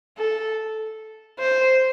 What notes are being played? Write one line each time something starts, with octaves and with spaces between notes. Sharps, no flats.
A4
C5